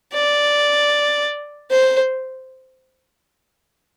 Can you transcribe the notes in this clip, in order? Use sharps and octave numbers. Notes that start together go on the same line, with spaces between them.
D5
C5